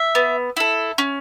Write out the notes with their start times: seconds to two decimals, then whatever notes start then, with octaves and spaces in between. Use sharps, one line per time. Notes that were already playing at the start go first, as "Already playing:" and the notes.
Already playing: E5
0.15 B3
0.57 E4 A4
0.98 C#4